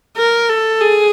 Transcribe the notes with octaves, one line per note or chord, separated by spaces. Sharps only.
A#4
A4
G#4